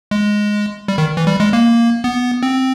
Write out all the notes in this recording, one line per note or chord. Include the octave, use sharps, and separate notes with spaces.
G#3
G3
D#3
E3
G3
G#3
A#3
B3
C4